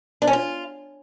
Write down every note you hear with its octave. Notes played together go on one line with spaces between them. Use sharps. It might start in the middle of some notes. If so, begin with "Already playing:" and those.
D4
C#4
F4